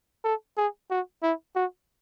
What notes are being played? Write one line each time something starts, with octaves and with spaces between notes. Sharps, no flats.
A4
G#4
F#4
E4
F#4